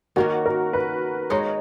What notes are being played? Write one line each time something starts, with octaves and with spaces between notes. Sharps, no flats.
D#3 A#3 C#4 F#4
A#4
B4
G#3 D#4 F#4 C#5